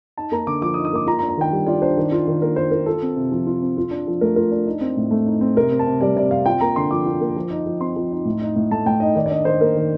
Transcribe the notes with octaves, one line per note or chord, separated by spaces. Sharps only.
D#4 A5
A#3 A#5
D3 D6
F3 D6
D#6
D#4
D#6
A#3 D6
F4 A#5
A#5
D4
A#5
D#3 G5
G3
F4 D5
D4 C5
D#3
F4
D#3
A#3 A#4
D#3 C5
F4 A#4
F4 A4
C4
C3
F3
F4
C4
F4
D4
F3
A3 A#4
F4 A#4
D4
D#4
C4
A2
A3
D#4
C4
C3 A#4
C4
A5
C3
G3 D5
C3 D5
C4 F5
F4 G5
A#3 A#5
D3 C6
F3 D6
F4
A#3
F3
D#4
F3
C4 C6
F3
D#4
A2
D#4
A2
A3 A5
A2 G5
D#4 D#5
D#3 D5
D5
D4 D#5
D#3 C5
A#3 A#4
D#3